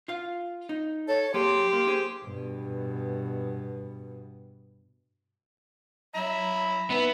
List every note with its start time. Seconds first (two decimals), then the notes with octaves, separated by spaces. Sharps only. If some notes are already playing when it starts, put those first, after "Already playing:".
0.08 F4 F5
0.69 D#4
1.08 A4 C#5
1.34 F#3 A#3 G4 G#4 C6
1.73 A#3
1.88 G#4 C5
2.24 G2 B2
6.15 F#3 E5 A#5 B5
6.90 B3 D#4 B4 E5